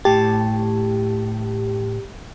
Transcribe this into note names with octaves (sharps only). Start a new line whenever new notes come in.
A2 G4 A5